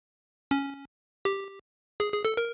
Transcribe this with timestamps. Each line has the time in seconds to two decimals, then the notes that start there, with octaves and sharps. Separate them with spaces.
0.51 C#4
1.25 G4
2.00 G#4
2.12 G#4
2.25 A4
2.37 A#4